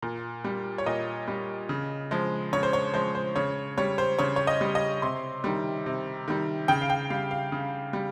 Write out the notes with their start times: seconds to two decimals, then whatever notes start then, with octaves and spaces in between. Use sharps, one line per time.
0.02 A#2
0.44 G3
0.78 C#5
0.86 A#2 D#5
1.28 G3
1.69 C#3
2.11 F3 G#3
2.53 C#3 C#5
2.63 C5
2.73 C#5
2.94 F3 G#3 C5
3.15 C5
3.36 C#3 C#5
3.78 G3 C#5
3.98 C5
4.19 C#3 C#5
4.36 C#5
4.47 D#5
4.61 G3
4.75 D#5
5.02 C3 C6
5.44 D#3 G3
5.86 C3
6.28 D#3 G3
6.68 C#3 G5
6.82 F5
6.90 G5
7.10 G3 F5
7.31 F5
7.52 C#3
7.93 G3